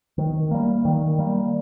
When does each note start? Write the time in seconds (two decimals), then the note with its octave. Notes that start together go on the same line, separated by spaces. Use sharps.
0.18 D#3
0.51 G3 A#3
0.85 D#3
1.19 G3 A#3